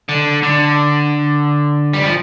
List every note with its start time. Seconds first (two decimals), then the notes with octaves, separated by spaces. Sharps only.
0.09 D3
0.43 D3
1.93 G3
2.04 F3